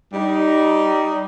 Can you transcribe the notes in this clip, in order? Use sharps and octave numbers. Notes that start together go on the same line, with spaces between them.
G3 D#4